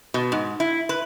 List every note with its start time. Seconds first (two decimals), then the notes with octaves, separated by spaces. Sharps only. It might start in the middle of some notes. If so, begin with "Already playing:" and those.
0.14 B2
0.32 G#2
0.60 E4
0.89 B4